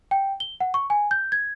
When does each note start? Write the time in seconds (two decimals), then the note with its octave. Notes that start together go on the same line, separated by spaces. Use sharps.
0.11 G5
0.40 G7
0.61 F#5
0.74 C#6
0.90 G#5
1.11 G6
1.32 G#6